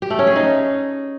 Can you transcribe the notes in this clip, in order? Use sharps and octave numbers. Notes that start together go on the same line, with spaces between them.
G4
A3
C#4
G#4
D#4